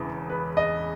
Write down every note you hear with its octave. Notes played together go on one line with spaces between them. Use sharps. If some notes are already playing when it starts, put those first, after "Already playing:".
Already playing: E1 E2 C#3 E3
B4
D#5